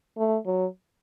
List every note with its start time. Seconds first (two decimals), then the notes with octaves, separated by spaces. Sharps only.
0.17 A3
0.46 F#3